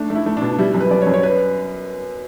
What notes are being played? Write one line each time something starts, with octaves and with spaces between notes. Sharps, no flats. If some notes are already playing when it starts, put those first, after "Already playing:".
Already playing: A3 D4
A3
E4
A3
D4
B2
D4
G3 E4
F#2
B4
F#2 D5
C#5
F#2
C#5
B4